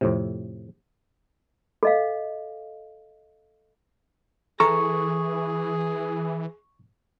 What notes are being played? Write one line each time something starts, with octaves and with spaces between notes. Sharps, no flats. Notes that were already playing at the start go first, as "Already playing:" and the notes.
F2 A2 C3
A4 D#5 F5
E3 G#4 A4 A#5 C#6